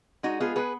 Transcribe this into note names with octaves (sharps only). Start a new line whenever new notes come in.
G#3 D#4 F#4
B3 F4 G#4
B3 G#4 B4